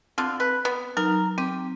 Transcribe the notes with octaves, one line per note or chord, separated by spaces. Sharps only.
D3 C4 F4
B4
B3
F#3 D#4 A#4
C4 G4